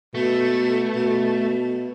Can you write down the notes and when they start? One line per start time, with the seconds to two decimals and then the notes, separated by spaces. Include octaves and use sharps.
0.15 B2 A3
0.96 B2